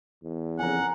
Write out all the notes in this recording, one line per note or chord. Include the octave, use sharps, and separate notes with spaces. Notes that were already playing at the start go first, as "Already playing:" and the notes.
E2
F2 C#3 A#4 F#5 G#5